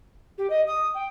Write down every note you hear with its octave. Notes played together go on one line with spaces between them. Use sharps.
G4
D#5
D#6
G5